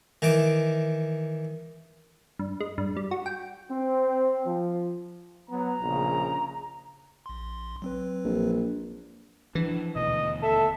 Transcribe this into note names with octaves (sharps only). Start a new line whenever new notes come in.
D#3 E3 D6
G2
G#3
G2
G3
F#4
G5
C4
F3
F#3 B3 A#5
A#1 C#3
A#1 C6
F#3 C4 B4
A#1
E3 F3 D4
D#1 D2 B2 D#5
A4 E5